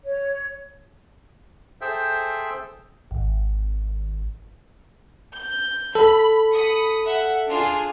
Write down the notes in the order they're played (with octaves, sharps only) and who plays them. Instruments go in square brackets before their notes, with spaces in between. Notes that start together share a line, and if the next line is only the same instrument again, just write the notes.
[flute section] C#5
[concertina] G#4 A4 C5 E5 G5
[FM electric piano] G#1
[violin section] G6
[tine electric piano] A4 [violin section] B5
[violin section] B5 D#6 C#7
E5 F#5
D4 F4 G#4